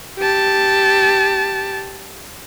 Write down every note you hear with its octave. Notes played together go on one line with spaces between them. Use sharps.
G4 A5